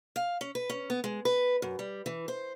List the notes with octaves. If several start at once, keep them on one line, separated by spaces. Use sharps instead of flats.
F5
C#4
B4
C#4
B3
G#3
B4
F#2
G3
E3
C5